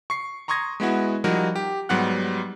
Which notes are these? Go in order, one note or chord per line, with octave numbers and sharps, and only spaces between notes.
C#6 C7
A#5 C6 C#6 D#6 G#6 A#6
G#3 B3 E4 F#4
F3 G3 D#4 F#4 A#4
G4
G#2 F#3 G3 B3 F#5 F#6